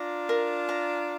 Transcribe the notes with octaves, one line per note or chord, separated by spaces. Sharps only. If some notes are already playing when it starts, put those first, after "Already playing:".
Already playing: D4 F4 A#5
A#4
A#5